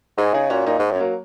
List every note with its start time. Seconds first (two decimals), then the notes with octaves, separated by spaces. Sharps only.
0.18 G#2 D#4 G#4
0.34 C#3 D#4 G#4
0.50 A#2 C#4 F#4
0.66 A#2 A#3 D#4
0.79 G#2
0.91 F#2
0.95 C#4
1.00 F#3 A#3